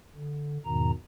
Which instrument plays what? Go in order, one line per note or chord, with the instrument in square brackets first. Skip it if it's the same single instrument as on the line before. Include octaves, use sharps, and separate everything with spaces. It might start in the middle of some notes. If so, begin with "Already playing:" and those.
[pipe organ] D3
E2 G#2 B2 D#3 A#5